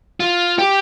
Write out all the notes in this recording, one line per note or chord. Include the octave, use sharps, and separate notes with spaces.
F4
G4